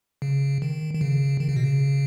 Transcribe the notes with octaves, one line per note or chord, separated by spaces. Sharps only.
C#3
D#3
D#3
C#3
D#3
C#3
B2
C#3